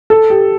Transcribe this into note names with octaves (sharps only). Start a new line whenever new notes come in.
A4
G4